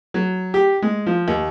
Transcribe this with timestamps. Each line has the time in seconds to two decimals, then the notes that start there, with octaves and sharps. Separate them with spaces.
0.14 F#3
0.54 G4
0.82 G#3
1.07 F3
1.28 D#2